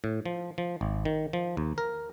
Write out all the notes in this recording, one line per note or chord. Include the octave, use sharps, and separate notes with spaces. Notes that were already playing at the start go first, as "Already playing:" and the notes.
A2
F3
F3
G#1
D#3
F3
D#2
A#4